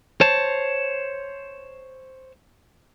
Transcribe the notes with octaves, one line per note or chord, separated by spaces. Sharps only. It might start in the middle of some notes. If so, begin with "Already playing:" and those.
C5 C#5 A5